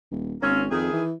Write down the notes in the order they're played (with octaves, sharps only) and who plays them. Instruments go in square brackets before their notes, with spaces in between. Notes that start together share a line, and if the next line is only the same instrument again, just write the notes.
[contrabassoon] D#1
[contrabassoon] G#1 [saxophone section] A#3 C4 C#4
[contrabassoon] F2 [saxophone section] D#3 E4 G#4
[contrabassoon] E3